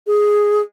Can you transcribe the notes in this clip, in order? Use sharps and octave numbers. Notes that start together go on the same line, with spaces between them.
G#4